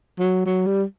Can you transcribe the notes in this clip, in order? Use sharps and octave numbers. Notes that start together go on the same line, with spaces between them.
F#3
F#3
G3